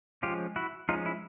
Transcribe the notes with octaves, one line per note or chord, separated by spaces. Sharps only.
F3 G#3 C#4 F4 G4
E4 F#4
F3 G#3 C#4 D#4 F4
E4